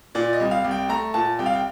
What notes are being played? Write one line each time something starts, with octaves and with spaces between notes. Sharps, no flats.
A#2 D5
D#5
C2
F5
C2
G5
A3 A#5
A#2 A5
C2 G5
F5
G5